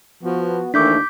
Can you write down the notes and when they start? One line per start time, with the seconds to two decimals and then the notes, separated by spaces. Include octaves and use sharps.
0.23 F3 B3 F#4
0.74 D#2 D#3 E3 A3 D4 D6 G6 B6